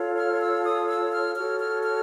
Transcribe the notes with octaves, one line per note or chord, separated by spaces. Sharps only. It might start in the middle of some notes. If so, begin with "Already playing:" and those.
Already playing: F4 A4 C#5
F6
E6
D#6
E6
F6
F#4 A4 C#5 F6
F6
F6